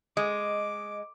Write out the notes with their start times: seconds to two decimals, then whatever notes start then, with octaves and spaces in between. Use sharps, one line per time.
0.17 G#3 D#5 D6